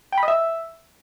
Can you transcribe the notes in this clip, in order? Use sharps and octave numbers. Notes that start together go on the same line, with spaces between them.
G5
B5
D#5
E5